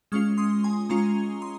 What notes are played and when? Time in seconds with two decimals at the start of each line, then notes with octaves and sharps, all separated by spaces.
0.12 G#3 C#4 F4 C#6 F6
0.38 C6 D#6
0.63 G#5 C6
0.89 G#3 C#4 F4 A#5 C#6
1.42 C6 D#6